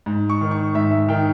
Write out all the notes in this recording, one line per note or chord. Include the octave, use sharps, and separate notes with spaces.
G#2
C#6
D#3
C#6
G#2 E5
E5
D#3 G5